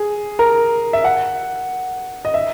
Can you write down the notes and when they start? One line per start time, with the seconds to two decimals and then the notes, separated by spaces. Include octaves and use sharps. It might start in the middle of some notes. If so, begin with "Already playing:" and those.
Already playing: G#4
0.39 A#4
0.93 E5
1.04 F#5
2.25 D#5
2.34 E5